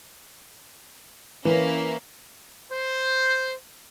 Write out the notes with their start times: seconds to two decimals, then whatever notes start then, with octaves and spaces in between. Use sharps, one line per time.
1.45 E3 A#3 C#4 E4
2.72 C5